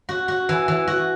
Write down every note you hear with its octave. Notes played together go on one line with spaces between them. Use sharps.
F#4
F#4
E3
E3
F#4